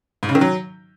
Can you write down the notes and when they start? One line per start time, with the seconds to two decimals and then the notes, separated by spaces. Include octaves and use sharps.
0.23 G#2
0.29 C#3
0.35 D#3
0.41 F#3